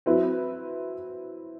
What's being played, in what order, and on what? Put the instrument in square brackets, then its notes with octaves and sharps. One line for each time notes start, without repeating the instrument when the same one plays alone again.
[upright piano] F#3 C4 E4 B4